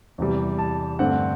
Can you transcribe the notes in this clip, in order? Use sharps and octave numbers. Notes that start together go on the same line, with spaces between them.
E2 C3 G3
A5
G2 D3 A3 C4 F#5